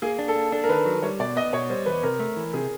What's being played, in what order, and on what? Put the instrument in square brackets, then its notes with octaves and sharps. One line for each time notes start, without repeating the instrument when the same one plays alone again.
[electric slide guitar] A#3 [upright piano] G#4
[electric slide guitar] D4
[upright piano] A4
[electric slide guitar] A#3
[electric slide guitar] D4 [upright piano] A4
[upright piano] A#4
[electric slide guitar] D#3 [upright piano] B4
[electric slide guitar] F#3
[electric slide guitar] G3 [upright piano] C#5
[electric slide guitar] B2 [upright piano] D5
[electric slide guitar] B3 [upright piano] D#5
[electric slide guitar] B2 [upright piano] C#5
[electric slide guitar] G3 [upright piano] C5
[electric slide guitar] E2 [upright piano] B4
[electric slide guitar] C3 [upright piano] A#4
[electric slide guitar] A3
E3
[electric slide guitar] C3 [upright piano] G#4